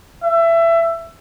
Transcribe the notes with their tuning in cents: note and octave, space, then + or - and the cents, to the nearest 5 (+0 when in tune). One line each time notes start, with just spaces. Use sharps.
E5 +20